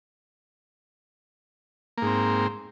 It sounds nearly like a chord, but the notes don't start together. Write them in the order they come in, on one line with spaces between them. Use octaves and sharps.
A#3 G#2 C4